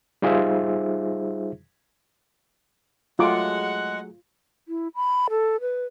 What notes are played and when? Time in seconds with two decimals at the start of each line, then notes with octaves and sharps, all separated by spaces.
0.22 G3 D#4 F4 G#4 C5 E5
3.19 F#3 G#3 A3 F4 G#4 F#5 D6
4.68 E4
4.95 B5
5.30 A4
5.61 B4